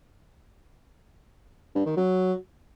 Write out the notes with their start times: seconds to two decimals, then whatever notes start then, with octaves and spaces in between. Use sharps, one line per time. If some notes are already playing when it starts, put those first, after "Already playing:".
1.75 G2
1.86 D#3
1.97 F#3